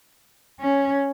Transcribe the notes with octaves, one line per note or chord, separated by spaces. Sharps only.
C#4